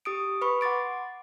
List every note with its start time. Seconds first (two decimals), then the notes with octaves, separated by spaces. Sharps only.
0.05 G4 D#6 D7
0.41 B4 B5 C#6
0.61 F#5 C6 D6 A6 D7